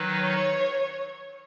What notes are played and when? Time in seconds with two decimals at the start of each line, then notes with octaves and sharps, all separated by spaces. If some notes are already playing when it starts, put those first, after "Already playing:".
Already playing: D#3 F#3 D#4 B4
0.21 C#5